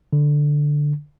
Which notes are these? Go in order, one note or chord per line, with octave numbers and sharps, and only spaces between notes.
D3